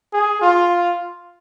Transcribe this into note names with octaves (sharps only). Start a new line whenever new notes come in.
G#4
F4